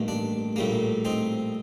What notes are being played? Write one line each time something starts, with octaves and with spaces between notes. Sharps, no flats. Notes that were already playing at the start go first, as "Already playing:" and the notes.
Already playing: A1 G2 D#3 A#3
D4
A#1 A2 G3 A#3
C4 D#4